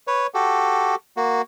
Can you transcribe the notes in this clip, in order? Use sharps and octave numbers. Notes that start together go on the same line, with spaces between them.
B4 C#5
F#4 G4 A4
A#3 F#4